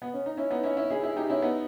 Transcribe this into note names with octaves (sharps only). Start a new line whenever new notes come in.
B3
C#4
D#4
C#4 E4
B3 D#4
C#4 E4
C#4 E4
E4 G#4
E4 G#4
D#4 G4
C#4 E4
B3 D#4